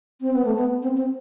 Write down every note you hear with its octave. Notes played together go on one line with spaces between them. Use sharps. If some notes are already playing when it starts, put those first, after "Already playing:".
C4
B3
A3
B3
C4
C4